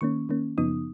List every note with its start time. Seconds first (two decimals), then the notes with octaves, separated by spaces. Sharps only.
0.01 D#3 A#3 C#4 C#6
0.29 D#3 A#3 C#4
0.58 F#2 C#3 F3 B3 D#4 D#6